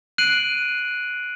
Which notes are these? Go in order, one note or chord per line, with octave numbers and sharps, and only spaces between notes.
F#6 C7 D7 D#7 F#7